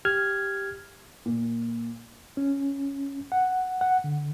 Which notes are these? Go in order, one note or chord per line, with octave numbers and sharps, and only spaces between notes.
G4 F6 G#6
A#2
C#4
F#5
F#5
D3